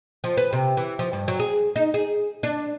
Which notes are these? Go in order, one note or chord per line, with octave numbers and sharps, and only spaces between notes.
F3
B4
C3
E3
F3
G2
F#3
G#4
D#4
G#4
D4